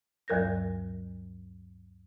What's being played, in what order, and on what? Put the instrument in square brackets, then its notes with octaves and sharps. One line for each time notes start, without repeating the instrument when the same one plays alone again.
[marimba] D2 G2 F#3 A#4 G6 A#6